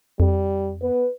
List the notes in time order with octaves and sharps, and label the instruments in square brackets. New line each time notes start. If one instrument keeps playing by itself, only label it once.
[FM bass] F2 [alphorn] G3
[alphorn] B3 [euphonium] B4